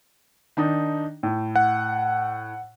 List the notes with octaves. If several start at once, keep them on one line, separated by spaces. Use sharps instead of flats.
D#3 D4 D#4
A2
F#5